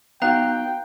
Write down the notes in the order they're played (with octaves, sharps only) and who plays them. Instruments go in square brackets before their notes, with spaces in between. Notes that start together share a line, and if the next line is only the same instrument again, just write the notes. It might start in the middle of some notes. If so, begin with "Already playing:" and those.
[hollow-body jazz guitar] B3 D#4 F#4 [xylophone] F5 A#5 F#6 [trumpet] G5